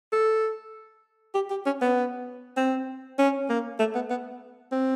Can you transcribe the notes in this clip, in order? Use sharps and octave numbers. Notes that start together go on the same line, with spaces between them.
A4
G4
G4
C#4
B3
C4
C#4
A#3
A3
B3
B3
C4